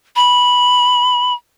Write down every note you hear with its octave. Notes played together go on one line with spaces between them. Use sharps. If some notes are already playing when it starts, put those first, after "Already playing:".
B5